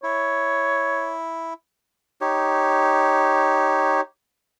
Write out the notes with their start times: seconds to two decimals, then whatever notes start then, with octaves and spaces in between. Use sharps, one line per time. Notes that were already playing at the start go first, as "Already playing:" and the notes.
0.03 E4 C#5
2.21 D#4 G4 C#5